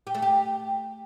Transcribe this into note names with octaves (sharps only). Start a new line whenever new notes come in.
G4
A3
G4